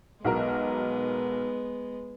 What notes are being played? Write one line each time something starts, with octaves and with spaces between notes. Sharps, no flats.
B1 G#3 B3 F#4 A#4